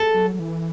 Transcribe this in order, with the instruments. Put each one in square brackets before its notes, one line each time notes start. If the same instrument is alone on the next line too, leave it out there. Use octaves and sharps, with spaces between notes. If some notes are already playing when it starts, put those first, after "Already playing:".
Already playing: [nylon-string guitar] A4
[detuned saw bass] F#3
F#3
E3